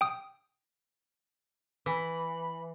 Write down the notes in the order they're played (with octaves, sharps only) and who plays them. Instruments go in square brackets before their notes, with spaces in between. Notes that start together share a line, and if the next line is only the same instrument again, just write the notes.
[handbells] G5 D#6
[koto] E3 [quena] B5